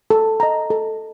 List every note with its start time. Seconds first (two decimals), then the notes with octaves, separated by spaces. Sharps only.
0.10 A4
0.40 D#5 A#5
0.70 A4